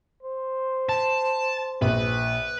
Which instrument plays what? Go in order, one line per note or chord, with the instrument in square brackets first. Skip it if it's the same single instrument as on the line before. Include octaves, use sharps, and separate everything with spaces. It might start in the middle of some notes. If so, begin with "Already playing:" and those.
[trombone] C5
[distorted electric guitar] A5
[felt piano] A#1 [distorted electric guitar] B4